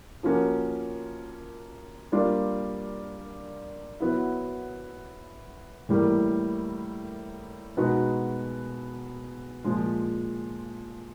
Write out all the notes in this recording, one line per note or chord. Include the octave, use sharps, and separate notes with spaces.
F3 A#3 C#4 F#4
G3 A#3 D4 F4
F#3 B3 E4
A2 E3 G3 A#3
B2 G#3 B3 D#4 F#4
A#2 F3 G#3